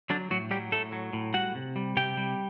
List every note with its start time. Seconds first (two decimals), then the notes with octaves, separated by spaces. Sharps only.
0.10 D3 F#3 D4
0.30 A2 F#3 F#4
0.51 F#3 G3 G4
0.72 A2 A3 A4
0.92 F#3
1.13 A2
1.34 G3 F#4 F#5
1.55 C3
1.76 G3
1.97 C3 G4 G5
2.17 G3